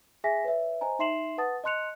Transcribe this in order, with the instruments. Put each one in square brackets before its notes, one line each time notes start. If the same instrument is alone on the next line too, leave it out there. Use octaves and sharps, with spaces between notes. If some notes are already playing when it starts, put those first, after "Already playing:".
[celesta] G#4 E5 G#5 A#6 B6
B4 C#5 E5
C5 D#5 G#5 A#5
D#4 E5 C6 C7 E7 F#7
B4 F#5 A5 D#6 A6
D#5 A5 C6 F#6 C#7 F7